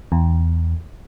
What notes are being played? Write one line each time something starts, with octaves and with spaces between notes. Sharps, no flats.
E2